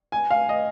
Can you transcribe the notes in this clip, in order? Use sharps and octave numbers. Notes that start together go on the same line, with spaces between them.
G#5
F5
D#5